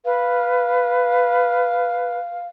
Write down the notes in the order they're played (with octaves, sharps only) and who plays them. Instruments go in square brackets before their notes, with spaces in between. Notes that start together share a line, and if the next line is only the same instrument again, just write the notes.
[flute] B4 [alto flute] F5